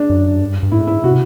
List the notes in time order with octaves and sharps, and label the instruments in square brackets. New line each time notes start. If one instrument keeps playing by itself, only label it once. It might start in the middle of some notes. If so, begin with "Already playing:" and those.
Already playing: [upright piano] D4
[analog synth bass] F#2
G2
G2
[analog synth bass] A2 [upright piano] E4
[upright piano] E4
[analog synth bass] C3 [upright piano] F#4